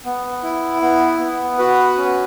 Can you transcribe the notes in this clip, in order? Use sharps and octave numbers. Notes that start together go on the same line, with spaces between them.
B3
E4
B3
B3
F#4 B4
C#4